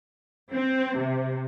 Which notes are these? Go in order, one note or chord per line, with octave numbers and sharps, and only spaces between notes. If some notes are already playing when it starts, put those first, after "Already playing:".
C4
C3